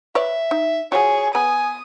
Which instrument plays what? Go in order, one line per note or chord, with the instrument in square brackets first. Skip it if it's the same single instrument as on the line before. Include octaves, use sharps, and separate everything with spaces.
[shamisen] B4 C#5 D5 [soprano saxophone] E5
[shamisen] D#4
[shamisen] F3 F#4 [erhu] G#4 [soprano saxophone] C#5
[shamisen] B3 B5 [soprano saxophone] G#5 [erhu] D#6